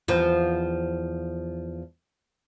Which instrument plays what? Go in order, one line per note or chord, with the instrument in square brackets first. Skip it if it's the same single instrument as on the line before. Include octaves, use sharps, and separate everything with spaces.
[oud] E2 F3